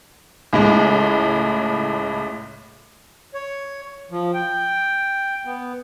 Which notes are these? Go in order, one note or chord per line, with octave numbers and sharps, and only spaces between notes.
C#2 A2 G#3
C#5
F3
G5
B3